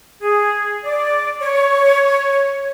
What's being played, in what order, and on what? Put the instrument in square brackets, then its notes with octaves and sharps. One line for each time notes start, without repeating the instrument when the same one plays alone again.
[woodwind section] G#4
D5
C#5